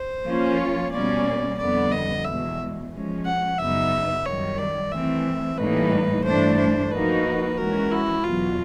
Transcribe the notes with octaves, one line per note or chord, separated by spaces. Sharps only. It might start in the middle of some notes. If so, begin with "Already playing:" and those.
Already playing: C5
F3 A#3 C#4 F4
C#5
B2 G3 A#3 C#4 D5
F2 D3 G3 B3 D5
D#5
E2 B2 G#3 E5
F3 G#3 C#4
F#5
F#2 C#3 F#3 B3 D#4 E5
F#2 D#3 G3 C#5
D5
E3 A3 C4 E5
A2 E3 G3 A#3 D#4 B4
G2 E3 A3 D4 C5
C5
F3 A#3 D#4 F#4 A#4 B4
E3 G#3 C#4 F#4 A#4
E4
E2 B2 F#3 F4